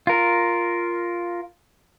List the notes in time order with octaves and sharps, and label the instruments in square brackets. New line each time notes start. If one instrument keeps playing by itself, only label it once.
[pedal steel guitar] F4 A#4